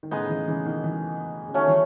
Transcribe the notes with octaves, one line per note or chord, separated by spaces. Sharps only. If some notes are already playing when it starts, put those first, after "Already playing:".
D#3
A2 C#3 G#3 B3 D#4 G#4
C#3 E3
C#3 E3
B2 D#3
C#3 E3
C#3
D#3 F#3 A3 C#4
E3